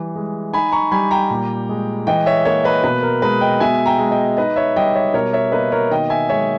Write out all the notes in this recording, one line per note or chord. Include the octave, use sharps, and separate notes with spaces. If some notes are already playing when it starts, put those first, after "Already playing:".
Already playing: E3 G3
G#3
D#4 G#5 B5
A#5 C#6
G3 G#5 B5
G5 A#5
A#2
G#3
E3 D#5 G5
C#5 E5
A#3 C#5 E5
B4 D#5
B2 B4
A#4
G#3 B4
D#5 G5
B2 E5 G#5
G5 A#5
G#3
D#5 G5
D#4 B4 D#5
C#5 E5
G3 D#5 G5
C#5 E5
B2 A#4 C#5
C#5 E5
A#3 B4 D#5
A#4 C#5
D#3 D#5 G5
E5 G#5
G#3 C#5 E5